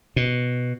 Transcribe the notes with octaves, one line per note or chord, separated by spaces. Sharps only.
B2